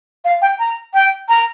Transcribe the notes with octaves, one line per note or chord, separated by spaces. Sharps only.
F5
G5
A#5
G5
A#5